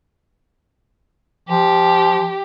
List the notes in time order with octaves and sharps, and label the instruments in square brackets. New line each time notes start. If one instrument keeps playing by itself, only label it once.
[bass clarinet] F3 [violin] G4